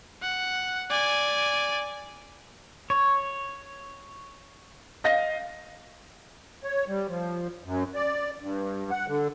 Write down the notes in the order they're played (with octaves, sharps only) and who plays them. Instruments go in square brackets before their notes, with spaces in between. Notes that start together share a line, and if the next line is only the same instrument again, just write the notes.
[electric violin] F#5
D5 G#5
[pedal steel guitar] C#5
[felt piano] D#5 F5 A#6
[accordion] C#5
G3
F3
F#2
D5
G2
F#5
D3